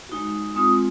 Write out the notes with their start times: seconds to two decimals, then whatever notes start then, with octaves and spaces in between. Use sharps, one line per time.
0.09 G#3 D#4 F#4
0.55 G#3 C4 F4 D#6